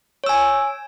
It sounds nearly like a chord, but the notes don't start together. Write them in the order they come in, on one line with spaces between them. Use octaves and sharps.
C#5 E6 G#5